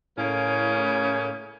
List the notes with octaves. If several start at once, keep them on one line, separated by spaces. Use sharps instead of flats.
A2 C#3 A#3 C#4